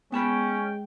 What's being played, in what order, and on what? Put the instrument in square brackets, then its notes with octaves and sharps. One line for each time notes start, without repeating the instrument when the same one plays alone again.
[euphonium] G#3 [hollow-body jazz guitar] B3 A5 B5 [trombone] C#4 [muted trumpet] G5